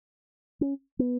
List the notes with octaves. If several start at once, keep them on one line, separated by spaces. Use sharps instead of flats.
C#4
B3